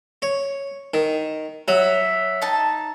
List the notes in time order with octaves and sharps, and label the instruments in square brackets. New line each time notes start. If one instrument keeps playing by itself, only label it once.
[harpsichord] C#5
D#3
[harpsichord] F#3 [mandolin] E5
[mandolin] D#4 A5